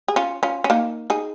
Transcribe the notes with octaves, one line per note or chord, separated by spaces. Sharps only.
G#4
C#4 F4
C#4 F4
C#4
A#3 D#4
D#4 G#4